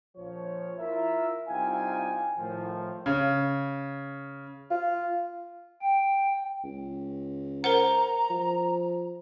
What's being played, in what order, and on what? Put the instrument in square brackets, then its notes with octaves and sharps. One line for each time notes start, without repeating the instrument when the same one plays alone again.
[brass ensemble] A#1 F3 C#5
E4 F4 A#4 E5
C2 D#4 F4 F5 G5 G#5
A2 D#3 F3
[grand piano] C#3
[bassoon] F4
[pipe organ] G5
[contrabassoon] C#2
[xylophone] A#4 C5 F#5 [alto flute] A#5
[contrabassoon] F3